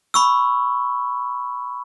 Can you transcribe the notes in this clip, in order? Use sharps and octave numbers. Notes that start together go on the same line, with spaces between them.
B5 C#6 E6